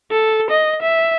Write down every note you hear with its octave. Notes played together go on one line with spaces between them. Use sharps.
A4
D#5
E5